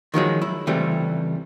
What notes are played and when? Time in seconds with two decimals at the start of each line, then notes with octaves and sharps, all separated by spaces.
0.14 D#3 F3 F#3 G#3
0.42 E4
0.67 C#2 C3 E3 G3 A3